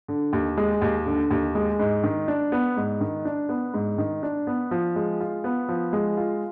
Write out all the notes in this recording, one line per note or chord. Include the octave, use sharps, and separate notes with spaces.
D3
D#2
G#3
D#2
D3
D#2
G#3
G#2
D#3
D4
B3
G#2
D#3
D4
B3
G#2
D#3
D4
B3
F3
G#3
F4
B3
F3
G#3
F4